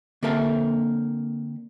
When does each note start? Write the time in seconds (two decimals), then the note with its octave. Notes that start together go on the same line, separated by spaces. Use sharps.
0.23 D3 A#3 C4 A4 A#4 E5